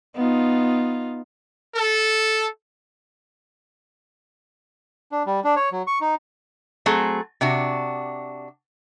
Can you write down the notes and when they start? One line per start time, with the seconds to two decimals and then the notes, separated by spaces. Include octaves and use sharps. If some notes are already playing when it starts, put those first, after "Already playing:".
0.15 B3 D#4 F4
1.74 A4
5.12 D4
5.26 G3
5.44 D4
5.56 C#5
5.72 F#3
5.87 C#6
6.01 D#4
6.86 F#3 A3 C4 G#4
7.41 C3 D4 F#4